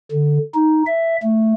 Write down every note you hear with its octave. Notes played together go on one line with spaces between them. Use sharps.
D3
D#4
E5
A3